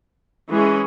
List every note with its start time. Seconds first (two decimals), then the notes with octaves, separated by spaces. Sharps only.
0.51 E3 G#3 C#4 G#4